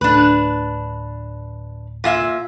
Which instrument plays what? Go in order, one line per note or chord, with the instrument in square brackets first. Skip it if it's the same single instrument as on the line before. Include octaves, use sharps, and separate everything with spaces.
[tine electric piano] D2 A2 [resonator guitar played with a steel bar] D4 B4
[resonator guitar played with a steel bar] A#2 F4 E5